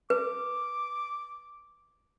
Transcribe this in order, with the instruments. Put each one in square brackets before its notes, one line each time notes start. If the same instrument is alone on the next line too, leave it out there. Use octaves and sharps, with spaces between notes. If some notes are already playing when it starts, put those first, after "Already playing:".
[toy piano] B4 [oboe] D6